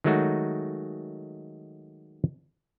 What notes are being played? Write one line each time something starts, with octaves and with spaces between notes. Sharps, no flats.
D#3 F#3 G#3 A3 D#4 F#4